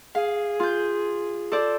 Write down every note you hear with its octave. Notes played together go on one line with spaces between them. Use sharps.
G#4 F5
F4 G6
A4 C5 D5